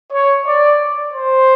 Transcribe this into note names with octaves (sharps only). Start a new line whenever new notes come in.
C#5
D5
C5